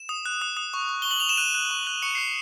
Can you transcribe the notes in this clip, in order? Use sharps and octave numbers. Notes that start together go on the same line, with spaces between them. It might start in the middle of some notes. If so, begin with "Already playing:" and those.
Already playing: E7
D#6
F#6
D#6
D#6
C#6
C#6
C#6 G7
F#7
C#6 F7
E7
F#6 D#7
F#6
C#6
F#6
C#6 C#7
F#6 C7